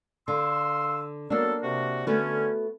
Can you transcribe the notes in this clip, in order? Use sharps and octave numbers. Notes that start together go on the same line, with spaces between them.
D3 F5 C6 E6
F#3 A#3 B3 D4 A4
C3 F#4
D3 A3 B3 C#4 F#4